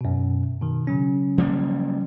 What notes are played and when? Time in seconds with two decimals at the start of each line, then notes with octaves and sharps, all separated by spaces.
0.01 F#2 B2
0.62 B2 D#3
0.87 C#3 F#3 C#4
1.38 F3 G3 A#3